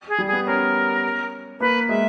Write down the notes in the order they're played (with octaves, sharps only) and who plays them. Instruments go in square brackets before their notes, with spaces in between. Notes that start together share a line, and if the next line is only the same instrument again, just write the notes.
[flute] G#4
[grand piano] G3
[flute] G#4
[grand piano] B3
[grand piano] C#4 [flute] A#4
[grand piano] A#3 [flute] B4
[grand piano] G#3 [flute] E5